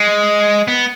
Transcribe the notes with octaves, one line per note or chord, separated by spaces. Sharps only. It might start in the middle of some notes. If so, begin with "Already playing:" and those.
Already playing: G#3
B3